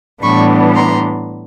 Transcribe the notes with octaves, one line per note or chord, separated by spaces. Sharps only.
A2 E3 G3 B3 D4 B5 C#6
A#5 C6